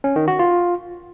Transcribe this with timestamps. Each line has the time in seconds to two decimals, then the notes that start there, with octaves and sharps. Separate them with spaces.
0.04 C#4
0.16 D#3
0.28 F#4
0.39 F4